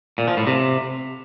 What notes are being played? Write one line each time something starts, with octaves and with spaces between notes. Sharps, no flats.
A#2
F3
A2
C3